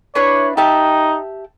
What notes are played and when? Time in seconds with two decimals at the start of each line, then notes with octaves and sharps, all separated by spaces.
0.15 D4 E4 B4 C#5
0.57 D#4 G4 E5 A5